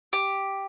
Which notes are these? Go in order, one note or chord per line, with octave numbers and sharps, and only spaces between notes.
G4